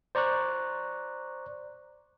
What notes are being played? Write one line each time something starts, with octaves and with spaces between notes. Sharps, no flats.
C5 D5 A#5 C#6 F#6